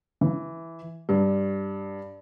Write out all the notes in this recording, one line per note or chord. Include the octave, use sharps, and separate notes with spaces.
E3
G2